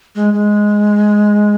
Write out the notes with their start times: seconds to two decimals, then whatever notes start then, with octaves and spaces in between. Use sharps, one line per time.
0.15 G#3
0.34 G#3